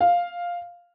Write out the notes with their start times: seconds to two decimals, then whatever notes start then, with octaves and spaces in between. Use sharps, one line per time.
0.01 F5